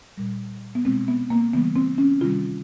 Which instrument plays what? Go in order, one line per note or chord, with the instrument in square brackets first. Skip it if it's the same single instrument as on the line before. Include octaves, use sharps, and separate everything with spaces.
[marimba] A#2 G3
B3
B2 G#3 C4
B3
A#3
C#3 E3 G3 B3
C4
C#4
C3 D#3 G3 F4